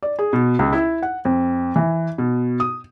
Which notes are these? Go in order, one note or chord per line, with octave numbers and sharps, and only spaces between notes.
D5
G#4
B2
C#2
E4
F#5
F2
E3
B2
D#6